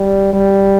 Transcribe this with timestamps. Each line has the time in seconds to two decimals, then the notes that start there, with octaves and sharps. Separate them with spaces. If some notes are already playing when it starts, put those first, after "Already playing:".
Already playing: G3
0.33 G3